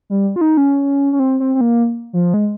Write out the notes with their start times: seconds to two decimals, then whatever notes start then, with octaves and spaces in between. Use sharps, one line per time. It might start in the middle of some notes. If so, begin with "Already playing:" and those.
0.10 G3
0.36 F4
0.41 D#4
0.57 C#4
1.13 C#4
1.19 C4
1.40 C4
1.55 C4
1.61 A#3
2.13 F3
2.34 G#3